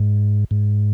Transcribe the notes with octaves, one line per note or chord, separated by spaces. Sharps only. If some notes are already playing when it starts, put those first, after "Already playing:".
Already playing: G#2
G#2